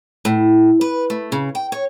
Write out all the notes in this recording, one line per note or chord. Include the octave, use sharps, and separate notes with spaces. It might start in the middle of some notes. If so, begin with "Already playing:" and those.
A2
B4
A3
C#3
G5
C#5